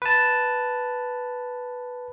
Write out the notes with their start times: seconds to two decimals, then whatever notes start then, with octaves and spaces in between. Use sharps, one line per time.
0.02 B4 A5